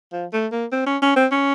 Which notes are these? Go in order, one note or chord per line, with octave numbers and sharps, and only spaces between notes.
F3
A3
A#3
C4
C#4
C#4
C4
C#4